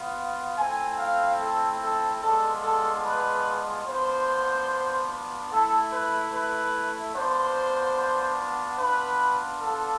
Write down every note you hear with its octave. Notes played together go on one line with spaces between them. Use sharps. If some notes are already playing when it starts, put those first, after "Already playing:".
Already playing: B3 F4
A3 C4 E4 G#5
F5
A4
A4
G#3 B3 D4 F4 A4
A4
B4
B3 D4 F4 C5
A3 E4 A4
B4
B4
B3 D4 F4 C5
B3 D4 F4 B4
A4